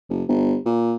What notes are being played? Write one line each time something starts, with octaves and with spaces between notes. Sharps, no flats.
F#1
G1
A#2